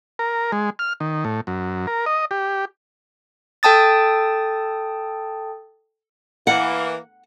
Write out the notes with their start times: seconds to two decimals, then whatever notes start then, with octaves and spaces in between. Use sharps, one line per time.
0.19 A#4
0.52 G#3
0.79 F6
1.00 D#3
1.24 A2
1.47 F#2
1.87 A#4
2.06 D#5
2.31 G4
3.63 A4 G5 A5 D#6 A6
6.47 E3 A#3 F#5